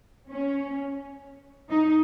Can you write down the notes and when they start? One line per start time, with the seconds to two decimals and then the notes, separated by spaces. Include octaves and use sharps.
0.29 C#4
1.69 D#4